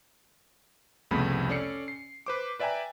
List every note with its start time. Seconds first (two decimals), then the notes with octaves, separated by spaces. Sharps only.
1.11 C2 F2 C#3 A3 B3 B5
1.49 C#4 A4 D5 C7 C#7
1.88 C7
2.26 B4 C5 D6
2.59 B4 D5 E5 G5 G#5 A#5